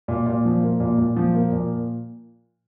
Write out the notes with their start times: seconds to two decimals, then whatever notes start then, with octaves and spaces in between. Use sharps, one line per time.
0.08 A#2
0.26 A#2
0.45 F3
0.63 A#3
0.80 A#2
0.98 A#2
1.16 F3
1.35 A#3
1.52 A#2